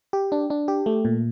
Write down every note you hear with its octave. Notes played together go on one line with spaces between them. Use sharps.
G4
D4
D4
G4
A3
A#2